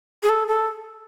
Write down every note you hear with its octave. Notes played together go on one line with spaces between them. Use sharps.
G#4
A4
A4